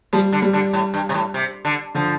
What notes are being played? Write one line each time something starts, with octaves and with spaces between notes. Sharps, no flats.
F3 G3
D3
G3
D3
A2
G2
C3
A2
C3
D3
D3 F3